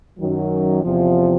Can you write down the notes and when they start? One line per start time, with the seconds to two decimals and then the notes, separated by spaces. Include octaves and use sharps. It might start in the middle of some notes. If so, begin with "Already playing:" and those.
0.18 F#2 D#3 F#3
0.83 E2 C3 F3